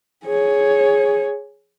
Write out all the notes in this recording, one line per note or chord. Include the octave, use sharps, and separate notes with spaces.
G#4 C#5